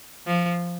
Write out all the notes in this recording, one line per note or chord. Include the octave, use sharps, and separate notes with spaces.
F3